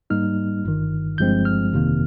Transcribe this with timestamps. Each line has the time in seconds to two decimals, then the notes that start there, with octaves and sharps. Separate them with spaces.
0.10 G#2 G3 A#3 D#4 F6
0.64 G1 G2 D#3
1.18 G1 G2 F3 G#3 C4 G6
1.45 F6
1.72 G1 F2 C3 D#3 A#3